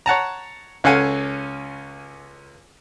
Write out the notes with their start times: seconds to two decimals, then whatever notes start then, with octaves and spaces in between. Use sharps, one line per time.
0.06 C#5 F#5 A5 A#5
0.84 C#2 C#4 A4 F5 F#5 G#5